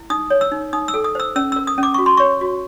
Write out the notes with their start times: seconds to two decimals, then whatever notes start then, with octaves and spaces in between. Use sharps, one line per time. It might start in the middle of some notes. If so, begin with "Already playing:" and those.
Already playing: E4
0.10 D#4 D#6
0.30 C#5
0.41 E6
0.52 D#4
0.73 D#4 D#6
0.88 E6
0.94 A4
1.04 D#6
1.15 C5 E6
1.36 C#4 E6
1.52 A#4 E6
1.67 D#6
1.78 C#4
1.83 D6
1.94 F#4 C#6
2.06 C6
2.17 C#5 C#6
2.41 F#4